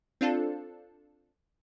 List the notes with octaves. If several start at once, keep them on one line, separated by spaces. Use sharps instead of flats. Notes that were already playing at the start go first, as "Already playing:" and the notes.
C4 D4 F4 A4